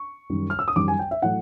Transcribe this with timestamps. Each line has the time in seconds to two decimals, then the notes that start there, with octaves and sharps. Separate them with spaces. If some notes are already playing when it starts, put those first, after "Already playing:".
Already playing: C#6
0.30 F#2 D#3 G3
0.50 F6
0.59 E6
0.68 D#6
0.76 F#2 D#3 G3 D6
0.88 G#5
0.99 G5
1.11 E5
1.22 A2 F#3 A3 F#5